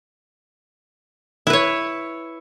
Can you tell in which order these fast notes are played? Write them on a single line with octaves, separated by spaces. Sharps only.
E4 B4 C#5